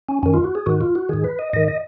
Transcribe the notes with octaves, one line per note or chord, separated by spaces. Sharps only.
C#4
F#2 D#3 C#4
F4
F#4
G#4
G#2 D#3 F#4
F4
F#4
G#2 D#3 G#4
B4
D#5
G#2 D#3 D#5
D#5